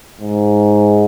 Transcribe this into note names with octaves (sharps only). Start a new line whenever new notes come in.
G#2